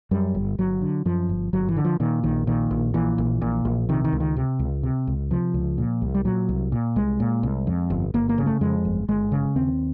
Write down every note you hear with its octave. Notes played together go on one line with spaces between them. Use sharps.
F#2 G3
G1
G1 F#3
D3
F#2 F3
G1
G1 F#3
E3
D3
F3
A#2 D#3
A#1 D#3
A#2 D#3
A#1
A#2 E3
A#1
A#2
A#1
C3 D#3
D#3
C#2
D#3
C3
C#2
C3
C#2
C3 F3
C#2
A#2
C2
G3
A#2 F#3
C2
A#2
C2 G#3
A#2
C2
F2
G1
G1 A#3
A#3
C#3
A3
F2 G#3
G1
G1 G#3
C#3
D#2 C4